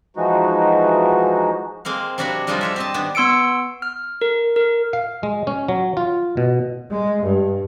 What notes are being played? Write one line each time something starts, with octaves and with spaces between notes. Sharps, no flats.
E3 F3 G#3 D#4 F#4
G#3 A#3 C4 F5
C3 F#3 D4 F#4 C#5 B5
F3 G3 G#3 D4 D#4 F4
G4 C#5 E5
C4 D#5 A5
D#3 B3 D4
B3 C6 E6 C#7 D7
F6
A#4
A#4
F5
G#3
C#4
F#3
F4
B2
G#3
G2